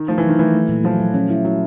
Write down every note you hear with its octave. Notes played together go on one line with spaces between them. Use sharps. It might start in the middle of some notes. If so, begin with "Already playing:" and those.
Already playing: D#3
F3 A3
E3 F#3
D#3
E3 A3
A3
A#2
F3 F#3
F#3
C#4
E4
F#3 E4